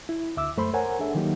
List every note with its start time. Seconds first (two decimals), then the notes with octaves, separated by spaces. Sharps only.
0.09 E4
0.37 D2 E5 D6 E6
0.57 F#2 A3 C5 B5 C6
0.74 A#4 C5 C#5 F#5 G#5 A#5
0.99 D4 G#4 A4 E5
1.15 D#3 F#3 A#3 D#4 G4